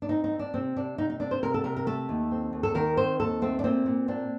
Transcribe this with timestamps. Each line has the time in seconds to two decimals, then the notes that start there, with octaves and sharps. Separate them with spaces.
0.02 D4
0.09 C4 D#4
0.24 D#4
0.32 C4
0.39 D4
0.54 C3 C4
0.76 C3 D4
0.98 C3 D#4
1.10 D#4
1.20 C4 D4
1.31 C5
1.42 C3 A#4
1.54 A4
1.64 C3 A#4
1.76 A#4
1.86 A3 A4
2.09 D#2
2.31 C4
2.53 D#2
2.63 A4
2.75 D#3 A#4
2.97 C4 C5
3.20 D#2 A4
3.41 A3 C4
3.59 D4
3.64 A#2 C4
3.86 A#2
4.08 C4 D4